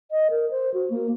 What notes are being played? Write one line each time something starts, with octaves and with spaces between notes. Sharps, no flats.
D#5
A#4
C5
F#4
A#3